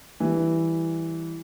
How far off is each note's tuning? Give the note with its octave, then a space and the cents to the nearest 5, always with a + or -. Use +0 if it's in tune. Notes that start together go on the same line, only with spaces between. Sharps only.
E3 +0 G3 +0